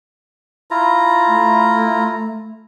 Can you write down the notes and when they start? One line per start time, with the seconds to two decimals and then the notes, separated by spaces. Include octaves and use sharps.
0.71 E4 F4 A#5
1.28 A3